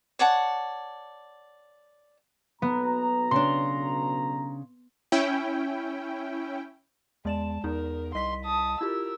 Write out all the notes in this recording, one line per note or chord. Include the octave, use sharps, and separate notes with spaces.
C#5 D5 F#5 A5
B1 B2 B3 A#5
C#3 D4 C6
C#4 E4 G5
E2 G#3 D5 A5 E7
E2 D#4 A#4
C2 D#5 C6 B6
A5 D#6
E4 F4 G4 A#4 E6